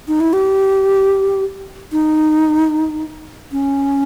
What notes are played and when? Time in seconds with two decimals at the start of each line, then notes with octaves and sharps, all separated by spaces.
0.08 D#4
0.20 E4
0.33 G4
1.92 D#4
3.52 C#4